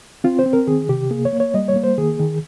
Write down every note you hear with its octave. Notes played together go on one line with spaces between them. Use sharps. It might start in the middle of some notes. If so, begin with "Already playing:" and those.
C4 F4
C5
C4
A#4
D#3 G#4
C3 G4
A#3 G#4
C#5
A#3
C#5
G3 D#5
C#5
A#3
C5
D#3 G#4
D#3